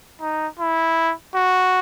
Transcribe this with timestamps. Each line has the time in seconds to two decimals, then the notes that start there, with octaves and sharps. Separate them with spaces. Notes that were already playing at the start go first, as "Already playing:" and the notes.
0.21 D#4
0.59 E4
1.35 F#4